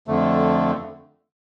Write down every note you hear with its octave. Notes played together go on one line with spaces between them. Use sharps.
F2 D3 A3